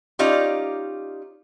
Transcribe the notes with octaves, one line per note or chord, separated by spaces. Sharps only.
C#4 D#4 F4 G4 D5